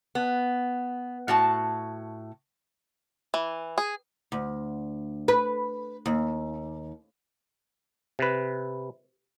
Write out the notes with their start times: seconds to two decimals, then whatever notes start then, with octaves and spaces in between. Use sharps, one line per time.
0.15 B3
1.28 A2 F#4 A5
3.34 E3
3.78 G#4
4.32 D2
5.28 B4
6.06 D#2
8.19 C3 B4